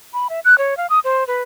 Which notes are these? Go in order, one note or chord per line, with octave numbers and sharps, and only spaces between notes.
B5
E5
F#6
C#5
F5
D#6
C5
B4